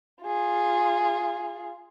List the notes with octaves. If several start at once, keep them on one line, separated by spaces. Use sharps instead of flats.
F4 G#4